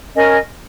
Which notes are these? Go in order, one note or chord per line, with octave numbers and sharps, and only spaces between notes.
C#4 A#4 D#5 G#5